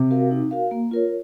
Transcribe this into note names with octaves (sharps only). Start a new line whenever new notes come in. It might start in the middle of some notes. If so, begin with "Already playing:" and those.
Already playing: C3
F#4 A#4 F5
D#4
F#4 A#4 F5
A#3
F4 A#4 C#5